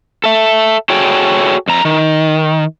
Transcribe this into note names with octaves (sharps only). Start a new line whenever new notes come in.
A4 E5
F#4 G#4 A4 C#5 G5
F2 A#5
D#3